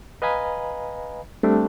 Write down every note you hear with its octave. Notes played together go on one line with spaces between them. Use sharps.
B4 D#5 F5 G#5 A#5 B5
G3 A3 C4 D4